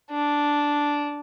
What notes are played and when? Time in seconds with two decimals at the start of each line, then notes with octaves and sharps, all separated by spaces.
0.11 D4